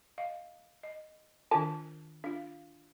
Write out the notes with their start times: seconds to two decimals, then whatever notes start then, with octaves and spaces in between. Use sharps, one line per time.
0.18 D#5 F5
0.83 D#5
1.51 D#3 D4 F4 A#4 G#5 A5
2.24 D4 F4 F5